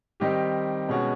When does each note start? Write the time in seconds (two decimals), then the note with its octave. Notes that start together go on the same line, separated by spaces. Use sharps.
0.20 D#3 G3 C4 D#4 G4
0.89 B2 G#3 C#4 F#4